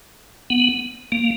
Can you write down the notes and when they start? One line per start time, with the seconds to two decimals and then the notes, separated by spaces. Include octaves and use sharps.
0.50 B3
1.12 A#3